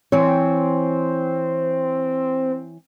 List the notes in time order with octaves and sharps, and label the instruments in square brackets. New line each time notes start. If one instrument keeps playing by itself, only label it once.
[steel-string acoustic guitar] E3 C#5 [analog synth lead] C4